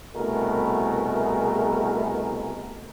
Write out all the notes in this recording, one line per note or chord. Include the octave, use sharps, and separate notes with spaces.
C2 B2 A3 G#4 A#4